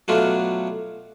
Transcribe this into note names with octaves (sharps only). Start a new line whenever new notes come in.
B2 F#3 A3 D4 F4